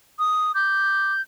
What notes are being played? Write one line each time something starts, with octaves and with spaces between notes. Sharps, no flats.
D#6
D6 G6